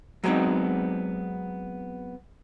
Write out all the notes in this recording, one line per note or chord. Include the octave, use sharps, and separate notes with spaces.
F#3 G#3 B3 C4 D#4